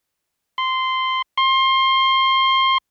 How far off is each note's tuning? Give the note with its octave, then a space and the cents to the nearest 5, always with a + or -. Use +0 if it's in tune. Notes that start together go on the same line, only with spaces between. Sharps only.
C6 -10
C6 +25